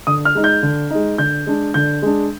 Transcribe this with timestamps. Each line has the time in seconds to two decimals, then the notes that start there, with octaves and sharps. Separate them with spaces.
0.07 D3 D#6
0.25 F6
0.35 G#3 D#4
0.44 G6
0.63 D3
0.90 G#3 D#4
1.18 D3 G6
1.47 G#3 D4
1.74 D3 G6
2.02 G#3 D4